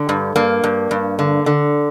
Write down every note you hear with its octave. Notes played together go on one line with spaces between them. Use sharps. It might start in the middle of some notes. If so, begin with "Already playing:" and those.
Already playing: D3
G2
G2 A#3
G2
G2
D3
D3